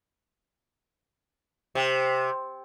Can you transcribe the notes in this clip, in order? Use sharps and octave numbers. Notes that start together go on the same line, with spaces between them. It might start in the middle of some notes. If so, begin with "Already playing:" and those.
C3